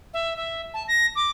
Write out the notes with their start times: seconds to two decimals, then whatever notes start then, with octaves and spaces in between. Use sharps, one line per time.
0.14 E5
0.36 E5
0.74 A5
0.88 A#6
1.16 D6